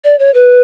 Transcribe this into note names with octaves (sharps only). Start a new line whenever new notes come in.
D5
C#5
B4